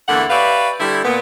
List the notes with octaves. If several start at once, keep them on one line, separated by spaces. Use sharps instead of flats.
E2 D3 E3 A3 A#3 F#5
G4 B4 C#5 D5 E5 F5
D3 G3 A3 E4
A#2 B3